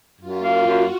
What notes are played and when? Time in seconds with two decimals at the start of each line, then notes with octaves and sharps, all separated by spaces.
0.20 F#2 F4
0.43 A#3
0.65 F#2 F#4